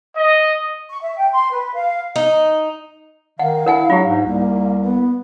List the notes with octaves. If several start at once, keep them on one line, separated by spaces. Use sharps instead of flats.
D#5
C#6
E5
G5
C6
B4
F5
D#4
D#3 F5 F#5
E4 A#4 F#5 G#5
F#3 F4 G4
G#2
C2 A#3
B3